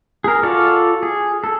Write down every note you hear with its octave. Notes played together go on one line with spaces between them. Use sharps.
G#4 A#4
F4 F#4 A4 D5 F5
G#4
A4